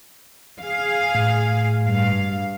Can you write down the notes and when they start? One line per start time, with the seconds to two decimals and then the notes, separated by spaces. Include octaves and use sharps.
0.61 G#4 F5
1.15 A2
1.83 G2 F5